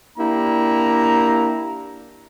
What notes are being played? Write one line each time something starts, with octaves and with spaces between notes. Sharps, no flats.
A#3 D4 E4 G4 A#5